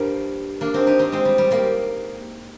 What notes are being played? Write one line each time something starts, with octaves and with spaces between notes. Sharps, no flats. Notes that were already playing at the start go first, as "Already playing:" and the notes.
Already playing: G2 F3 G3 A#3
A#3 D4
C4 D#4
D#4 G4
C4 D#4
G#3 C4
G3
G3
G3 A#3